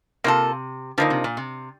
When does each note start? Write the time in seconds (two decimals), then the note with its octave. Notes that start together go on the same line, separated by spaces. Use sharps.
0.24 C3 A#3 F4 A4
0.98 D3 F3 A#3 D#4
1.10 C3
1.24 A#2
1.37 C3